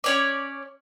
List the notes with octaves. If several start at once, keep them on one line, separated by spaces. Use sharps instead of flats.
C#4 C#5 D5